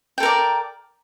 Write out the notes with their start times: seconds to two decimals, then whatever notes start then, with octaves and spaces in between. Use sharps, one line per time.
0.18 G5
0.20 A4
0.23 A#4
0.25 D5